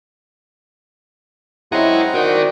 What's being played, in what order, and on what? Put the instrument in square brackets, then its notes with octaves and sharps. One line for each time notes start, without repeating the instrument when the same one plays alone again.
[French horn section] F#2 C#4 E4 [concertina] C4 F#5 A#5 [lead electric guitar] G#4 D#5
[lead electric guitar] D#4 A#4 [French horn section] F#4 D5